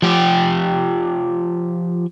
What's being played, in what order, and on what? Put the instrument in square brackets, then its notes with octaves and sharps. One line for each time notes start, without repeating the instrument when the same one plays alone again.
[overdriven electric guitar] F3 G4